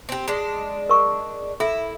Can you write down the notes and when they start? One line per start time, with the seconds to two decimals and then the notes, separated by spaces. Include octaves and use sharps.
0.09 C4 G4
0.28 G#3 D4
0.89 A#4 C#6
1.60 E4 A4 E5